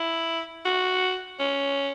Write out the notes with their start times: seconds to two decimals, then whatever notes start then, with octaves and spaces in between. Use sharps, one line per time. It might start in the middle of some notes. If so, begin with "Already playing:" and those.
Already playing: E4
0.65 F#4
1.39 C#4